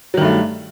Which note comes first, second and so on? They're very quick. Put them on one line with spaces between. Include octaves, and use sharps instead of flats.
F#3 D#3 G2 A3